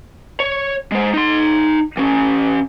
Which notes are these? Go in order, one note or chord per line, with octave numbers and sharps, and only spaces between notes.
C#5
G#3 C5
D#4 C6
E3 C#4